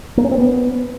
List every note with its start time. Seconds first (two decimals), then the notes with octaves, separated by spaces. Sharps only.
0.17 A#3
0.24 C#4
0.31 C4
0.38 B3